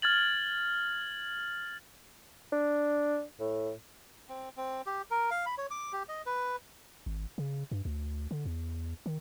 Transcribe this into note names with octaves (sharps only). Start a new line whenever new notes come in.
F6 G#6 A6 F#7
D4
A2
C4
C4
G4
A#4
F5
B5
C#5
D6
G4
D#5
B4
G#1
C#3
G2
D2
D3
E2
D#3